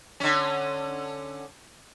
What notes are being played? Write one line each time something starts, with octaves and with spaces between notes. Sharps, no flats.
D3 C#4